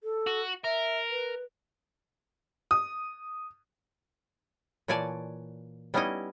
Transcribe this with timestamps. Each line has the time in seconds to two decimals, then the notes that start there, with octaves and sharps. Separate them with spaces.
0.03 A4
0.27 F#4
0.64 A#4 E5
1.10 B4
2.71 D#6
4.88 A#2 E3 C#5 D5 G#5 A5
5.94 G3 B3 C#4 D#4 E4 D#5